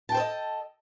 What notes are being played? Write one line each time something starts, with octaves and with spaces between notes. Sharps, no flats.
A4 C5 D#5 G5 A5